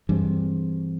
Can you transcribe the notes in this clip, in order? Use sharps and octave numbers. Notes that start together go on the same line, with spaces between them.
G2 E3 G#3 C4